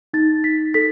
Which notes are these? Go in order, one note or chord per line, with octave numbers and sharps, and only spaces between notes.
D#4 A6
D#4 B6
A4 B6